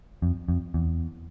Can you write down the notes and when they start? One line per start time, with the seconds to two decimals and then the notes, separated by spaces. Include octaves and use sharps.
0.22 F2
0.48 F2
0.74 E2